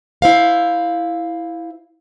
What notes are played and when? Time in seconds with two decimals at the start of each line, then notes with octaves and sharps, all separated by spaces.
0.22 E4 C5 F5